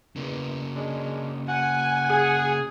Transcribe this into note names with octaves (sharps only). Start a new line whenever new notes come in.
E2 C#3 A#3
G#3 C#4 D4
F#5 G#5
G#4